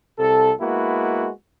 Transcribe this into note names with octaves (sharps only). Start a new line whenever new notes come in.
C2 C3 A4
G#3 A#3 B3 E4 F#4